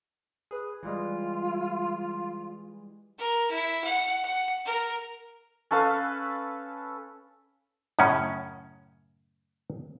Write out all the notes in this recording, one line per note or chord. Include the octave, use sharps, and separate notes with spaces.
G#4 B4
E3 G3 G#3 F4
A#4
E4
F#5
F#5
A#4
C#4 A4 B4 F5
F#2 A2 C#3 C#4